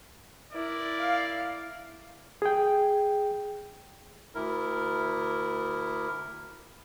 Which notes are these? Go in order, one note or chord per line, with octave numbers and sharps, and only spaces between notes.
E4 A#4 D5
F5
G#4 G5
D2 E4 A#4